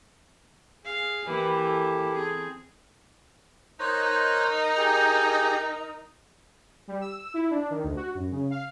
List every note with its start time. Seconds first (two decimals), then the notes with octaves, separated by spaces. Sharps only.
0.85 G#4 F5
1.27 E3 A#3 E4 G4 B4
1.60 A4
2.14 C4 G#4
3.80 D#4 A#4 C5 C#5 D#5 F#6
4.78 G4 G#4
6.88 G3
7.01 E6
7.34 E4
7.50 D4
7.70 D#3
7.84 D2
7.96 F#4
8.15 F#2
8.31 C#3
8.50 F5